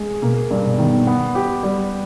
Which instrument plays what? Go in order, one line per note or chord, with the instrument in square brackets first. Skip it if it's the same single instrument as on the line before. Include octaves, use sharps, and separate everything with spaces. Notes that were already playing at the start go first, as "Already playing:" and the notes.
Already playing: [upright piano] G#3 G#4
[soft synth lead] B2 [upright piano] A#3
[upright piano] G2
[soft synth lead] B2
[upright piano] D#3
B3
G4
G3